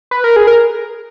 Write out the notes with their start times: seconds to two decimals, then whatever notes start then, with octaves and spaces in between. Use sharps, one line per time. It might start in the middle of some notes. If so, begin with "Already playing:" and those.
0.11 B4
0.24 A#4
0.36 G#4
0.47 A#4